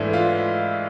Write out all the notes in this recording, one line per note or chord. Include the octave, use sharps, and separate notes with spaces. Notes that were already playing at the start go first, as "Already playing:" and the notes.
Already playing: G#2 E3 A3 D4 E4
F4 F5